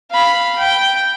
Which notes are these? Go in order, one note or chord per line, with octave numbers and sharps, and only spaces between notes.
F5 B5
G5